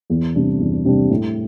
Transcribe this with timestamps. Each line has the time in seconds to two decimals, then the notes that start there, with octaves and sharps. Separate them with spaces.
0.10 E2
0.35 C3 G3 D4
0.60 E2
0.85 C3 G3 D4
1.10 A2